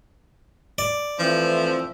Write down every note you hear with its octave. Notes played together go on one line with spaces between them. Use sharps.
D5
E3 F3 A3 C4 E5